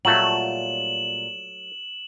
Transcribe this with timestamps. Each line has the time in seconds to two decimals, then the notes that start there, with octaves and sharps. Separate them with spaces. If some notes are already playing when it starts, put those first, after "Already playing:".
0.05 A#2 F#3 G3 A3 F4 E7 F#7